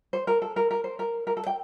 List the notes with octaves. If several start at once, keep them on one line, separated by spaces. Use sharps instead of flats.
C5
A#4
A4
A#4
A#4
C5
A#4
A#4
A4
G5